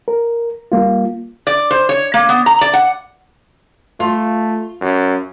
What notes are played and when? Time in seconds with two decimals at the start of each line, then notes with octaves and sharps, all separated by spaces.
0.08 A#4
0.72 G3 A#3 F4
1.47 D5
1.71 C5
1.89 C#5
2.14 A#3
2.29 B3
2.46 A#5
2.61 D5
2.73 F#5
4.00 A3 F4
4.81 F#2